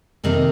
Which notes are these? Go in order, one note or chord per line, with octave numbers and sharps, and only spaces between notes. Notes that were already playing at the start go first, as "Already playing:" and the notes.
F2 C3 D#3 A#3 D#4